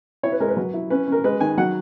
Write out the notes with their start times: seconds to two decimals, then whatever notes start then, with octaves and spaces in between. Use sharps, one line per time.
0.23 E4 C#5
0.32 B4
0.40 G#3 A#4
0.49 B4
0.57 F#3
0.74 E4
0.90 C#4 B4
1.07 C#4 A#4
1.24 G#3 B4
1.41 D#3 G#5
1.57 F#3 F#5